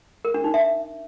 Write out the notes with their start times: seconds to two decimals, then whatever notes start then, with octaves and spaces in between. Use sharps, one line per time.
0.25 A#4
0.34 D4
0.44 D#4
0.54 E5